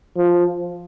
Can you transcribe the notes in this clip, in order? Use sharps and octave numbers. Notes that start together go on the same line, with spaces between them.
F3